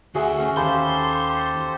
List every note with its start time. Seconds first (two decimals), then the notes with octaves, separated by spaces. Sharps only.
0.15 D2 F#4 G#4 E5
0.39 C#4
0.56 D#2 G4 A4 C5 F5 A5 B5 C6